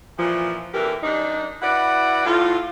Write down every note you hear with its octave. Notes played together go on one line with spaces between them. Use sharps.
A#2 E3 F3
F#2 B2 D3 E3 G4 A#4
F#2 D4 D#4
E4 F#4 B4 D5 F#5
A2 F4